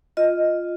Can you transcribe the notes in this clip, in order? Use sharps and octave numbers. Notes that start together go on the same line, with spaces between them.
F4 D#5